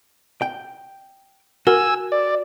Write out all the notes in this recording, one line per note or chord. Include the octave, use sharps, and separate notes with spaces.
G5
F#4 A#4 G#5 E6
D5